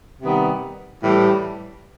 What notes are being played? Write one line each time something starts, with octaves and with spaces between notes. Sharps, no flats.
C3 D#3 G3 B3
A2 E3 G3